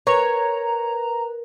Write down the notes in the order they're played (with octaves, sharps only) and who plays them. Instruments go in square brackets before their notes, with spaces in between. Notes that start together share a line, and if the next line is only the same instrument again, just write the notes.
[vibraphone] A#4 [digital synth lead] B4 [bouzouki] C#5 [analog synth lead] A#5